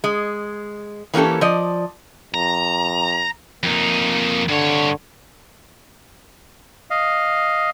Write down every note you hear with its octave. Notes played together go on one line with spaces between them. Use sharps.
G#3
E3 A#3 C#4 G4 A4
F3 D5 D#5
F2 A#5
F2 A#3 D#4
G2 D3 C#5
D#5 F5